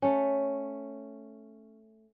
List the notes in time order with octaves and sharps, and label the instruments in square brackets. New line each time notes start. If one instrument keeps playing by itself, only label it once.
[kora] A3 C#4